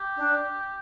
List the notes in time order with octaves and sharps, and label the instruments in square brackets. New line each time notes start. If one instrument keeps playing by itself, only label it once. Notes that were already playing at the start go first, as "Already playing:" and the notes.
Already playing: [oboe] G4
[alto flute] D4